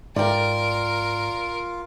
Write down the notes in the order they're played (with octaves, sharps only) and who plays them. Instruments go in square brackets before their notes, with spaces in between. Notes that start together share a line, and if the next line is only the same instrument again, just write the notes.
[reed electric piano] G#2 [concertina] F4 [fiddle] A#4 [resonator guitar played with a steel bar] D5 G5